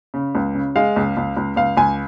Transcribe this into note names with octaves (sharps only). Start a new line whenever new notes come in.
C#3
C#2
C#3
G#3 F5
C#2
C#2
C#2
C#2 F5
C#2 G#5